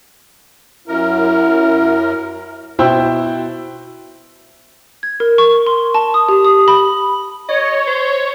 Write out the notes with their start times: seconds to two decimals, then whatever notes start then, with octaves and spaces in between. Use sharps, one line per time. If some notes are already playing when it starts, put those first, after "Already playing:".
0.88 F#2 E4 A#4
2.79 B2 E4 C5 G5 E6
5.03 G#6
5.20 A#4
5.38 C#6
5.67 C6
5.95 A5
6.14 D#6
6.29 G4
6.45 D#6
6.68 B5
7.49 C#5 D#5
7.87 C5